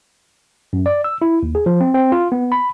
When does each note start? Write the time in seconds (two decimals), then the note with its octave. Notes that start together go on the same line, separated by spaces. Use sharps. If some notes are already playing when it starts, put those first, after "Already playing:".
0.73 F#2
0.86 D5
1.04 E6
1.22 E4
1.43 D#2
1.55 G#4
1.66 F3
1.81 C4
1.94 C4
2.12 F4
2.32 B3
2.52 B5